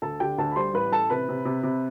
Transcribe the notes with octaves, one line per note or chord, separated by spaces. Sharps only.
D2 A4 A5
D3 G4 G5
D2 A4 A5
B5
G3 C5 C6
A1 B4 B5
A1 A4 A5
C3 B4 B5
C3
C3
C3